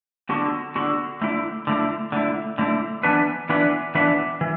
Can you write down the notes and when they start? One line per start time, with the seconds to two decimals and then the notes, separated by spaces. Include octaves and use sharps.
0.29 D3 B3 F#4
0.75 D3 B3 F#4
1.21 D3 A3 E4
1.67 D3 A3 E4
2.12 D3 A3 E4
2.58 D3 A3 E4
3.03 E3 B3 D4 B4
3.49 E3 B3 D4 B4
3.95 E3 B3 D4 B4
4.41 E3